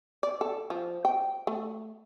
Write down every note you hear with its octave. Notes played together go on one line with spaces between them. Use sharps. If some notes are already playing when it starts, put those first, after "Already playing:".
D5
A4
F3
G5
A3